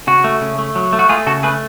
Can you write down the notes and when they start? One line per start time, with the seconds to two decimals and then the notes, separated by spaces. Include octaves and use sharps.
0.07 C#3 F#4
0.24 A3
0.41 C#3
0.58 A3
0.76 F#3
0.93 A3
0.99 F#4
1.09 A3 F4 G#4
1.26 C#3 F#4 A4
1.43 A3 G#4 B4